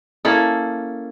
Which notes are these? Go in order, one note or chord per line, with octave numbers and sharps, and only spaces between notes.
A#3 C#4 E4 A4